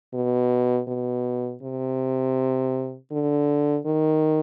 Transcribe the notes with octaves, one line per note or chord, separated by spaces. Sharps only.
B2
B2
C3
D3
D#3